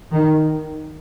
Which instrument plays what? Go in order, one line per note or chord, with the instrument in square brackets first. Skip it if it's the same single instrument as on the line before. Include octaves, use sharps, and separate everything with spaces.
[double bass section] D#3